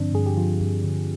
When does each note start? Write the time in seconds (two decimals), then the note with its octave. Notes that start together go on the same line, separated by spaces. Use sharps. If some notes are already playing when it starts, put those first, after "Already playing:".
Already playing: G2 D3 F3 C4 D4
0.13 G2 G#4
0.26 G4
0.37 F3 F4
0.61 G2
0.84 D3